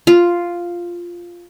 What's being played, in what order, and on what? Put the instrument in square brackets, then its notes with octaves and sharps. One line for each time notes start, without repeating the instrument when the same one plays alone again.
[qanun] F4